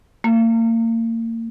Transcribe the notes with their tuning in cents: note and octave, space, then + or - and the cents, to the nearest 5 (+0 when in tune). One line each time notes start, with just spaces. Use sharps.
A#3 -35